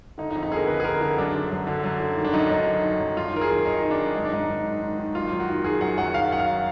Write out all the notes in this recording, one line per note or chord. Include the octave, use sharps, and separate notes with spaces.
D3 D#4
D#4
F2
D#4
D3 G#4 A#4
D3 B4
G#4
D3 A#4
D3 D#4
F#2 D4
D3
F#2
D3
F#2
D3
D#3
D4
F#2 D#4
F#2 D#4
D#3
D#3
F#2
F#2 F4
D#3 A#4
G#4
D#3
F#2 D#4
D#3
D4
F#2
G#2 D#4
D4
G#2 D#4
D#3
G#2
D#3
D#3
F#2 F4
F#2
F#4
D#3
D#3 G#4
F#2 F#5
F#2 F#5
D#3 F5
F#2 F#5
F5